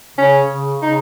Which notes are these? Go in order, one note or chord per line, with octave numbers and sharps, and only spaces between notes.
C#3 C#4
C#3
C#3 D#4